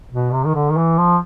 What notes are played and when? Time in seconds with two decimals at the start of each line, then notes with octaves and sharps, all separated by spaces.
0.12 B2
0.33 C3
0.46 D#3
0.54 D3
0.70 D#3
0.77 E3
0.98 F3